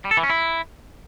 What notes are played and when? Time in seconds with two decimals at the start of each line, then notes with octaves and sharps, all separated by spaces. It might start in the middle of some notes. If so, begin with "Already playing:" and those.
0.05 G3
0.11 A4
0.17 E3
0.23 C#4
0.30 E4